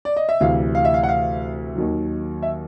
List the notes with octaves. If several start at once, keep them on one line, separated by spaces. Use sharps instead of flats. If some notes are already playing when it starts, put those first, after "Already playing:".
D5
D#5
E5
D2 C3 E3 F5
F5
E5
F5
F#5
F5
D#2 D#3 F#3
E5